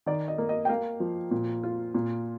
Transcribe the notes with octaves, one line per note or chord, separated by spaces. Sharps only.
D#3 D5
D#5
A#3
D#5
G5
A#3 F5
F3
A#2
F4
A#2